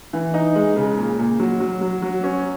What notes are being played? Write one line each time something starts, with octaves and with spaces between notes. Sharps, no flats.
E3
D#4
G#3
C#3
A#2
A#2
F#3
F#3
F#3
F#3
C#4